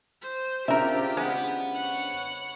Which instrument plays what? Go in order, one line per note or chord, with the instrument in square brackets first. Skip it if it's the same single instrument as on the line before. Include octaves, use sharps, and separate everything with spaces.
[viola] C5
[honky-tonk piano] C#3 C4 D4 [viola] F4 G4 [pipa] A#4 E5
[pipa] G#3 [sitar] B3
[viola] C#5 F#5